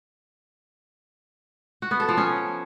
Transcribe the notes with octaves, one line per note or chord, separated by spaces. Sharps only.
F#4
B3
A4
F3
C#4